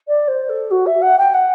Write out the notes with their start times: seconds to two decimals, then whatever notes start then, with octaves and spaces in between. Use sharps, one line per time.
0.08 D5
0.28 C5
0.49 A4
0.71 F#4
0.86 E5
1.02 F#5
1.18 G5
1.34 F#5